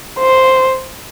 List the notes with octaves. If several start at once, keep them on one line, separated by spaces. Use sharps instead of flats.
C5